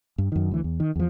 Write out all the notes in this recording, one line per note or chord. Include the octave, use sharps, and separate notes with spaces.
G2
F#2 D#3
D2 E3
E2
D#3
E2 F3